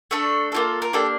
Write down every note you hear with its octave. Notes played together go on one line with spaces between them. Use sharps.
A3 D4 A4
A#3 F4 A4
A#4
A#3 D4 G4 A4